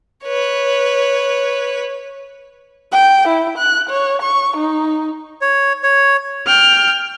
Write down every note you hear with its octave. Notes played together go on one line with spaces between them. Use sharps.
B4 C#5
G5
E4
F#6
C#5
C#6
D#4
C#5
C#5
G5 F6